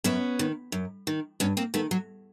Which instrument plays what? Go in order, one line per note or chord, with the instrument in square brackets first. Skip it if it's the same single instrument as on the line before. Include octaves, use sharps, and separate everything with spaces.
[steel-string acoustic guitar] F#2 B3 C#4
D#3
F#2
D#3
G2 B3 C#4
A#3 C4
D#3 A3 B3
F#3